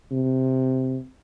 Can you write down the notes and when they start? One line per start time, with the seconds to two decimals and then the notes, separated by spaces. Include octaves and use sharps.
0.11 C3